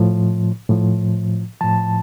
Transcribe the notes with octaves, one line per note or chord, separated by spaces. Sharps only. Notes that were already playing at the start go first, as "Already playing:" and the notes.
Already playing: A2 F3
A2 F3
A2 F3 A5